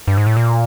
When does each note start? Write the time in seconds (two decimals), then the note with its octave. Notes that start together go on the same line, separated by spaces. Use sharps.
0.08 G2
0.18 G#2
0.27 A2
0.37 A#2